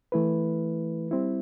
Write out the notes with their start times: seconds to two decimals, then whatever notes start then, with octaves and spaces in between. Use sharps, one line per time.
0.12 E3 A3 E4 B4
1.11 G3 C4 E4